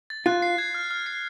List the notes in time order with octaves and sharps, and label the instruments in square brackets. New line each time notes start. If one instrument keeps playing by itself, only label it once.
[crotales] A6
[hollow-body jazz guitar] F4 [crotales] F#6
[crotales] C7
G#6
F6
F6
C7